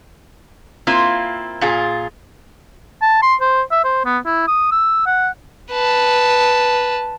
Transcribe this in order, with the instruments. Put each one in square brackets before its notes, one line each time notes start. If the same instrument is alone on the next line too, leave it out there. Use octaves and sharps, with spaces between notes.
[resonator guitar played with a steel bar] A#3 C4 E4 F4
A#2 F4 G#4
[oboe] A5
C6
C5
E5
C5
B3
E4
D#6
E6
F#5
[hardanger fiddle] B4 A5